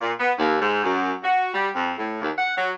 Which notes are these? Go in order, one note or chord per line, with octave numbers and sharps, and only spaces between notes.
A#2
B3
D#2
G#2
F#2
F#4
G3
F2
A2
D#2
F#5
F#3